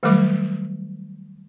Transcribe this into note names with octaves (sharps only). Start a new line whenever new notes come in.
D#3 F#3 G3 A3 A#4 D6